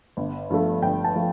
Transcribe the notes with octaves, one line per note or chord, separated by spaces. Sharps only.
G1
G2 F3 A3
G1 G5
A5
F3 A3